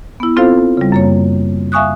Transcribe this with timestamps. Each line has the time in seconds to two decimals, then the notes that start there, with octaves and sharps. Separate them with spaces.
0.20 B3 E4
0.36 C4 F4 A4 C5 F5
0.77 C#3 G3
0.92 F#2 A#3 C#5
1.72 E5 F5 G#5 C#6 D#6 F#6